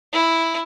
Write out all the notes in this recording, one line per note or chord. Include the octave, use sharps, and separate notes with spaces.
E4